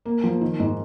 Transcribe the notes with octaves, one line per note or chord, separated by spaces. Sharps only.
A#3
F3
D#3
G#2